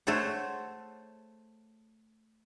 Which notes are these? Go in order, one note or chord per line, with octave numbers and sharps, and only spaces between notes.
A3 A4 C5 C#5 F#5